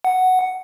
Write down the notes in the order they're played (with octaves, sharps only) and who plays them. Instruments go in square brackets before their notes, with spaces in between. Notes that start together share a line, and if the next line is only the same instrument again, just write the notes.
[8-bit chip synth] F#5